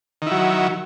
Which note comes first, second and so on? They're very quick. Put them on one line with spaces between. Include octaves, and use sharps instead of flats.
D#3 E4 F#3